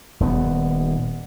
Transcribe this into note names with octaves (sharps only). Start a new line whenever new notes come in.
D#1 D#2 B3